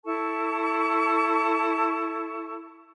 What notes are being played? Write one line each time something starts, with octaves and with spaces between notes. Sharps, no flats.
E4 A4 A5 C#6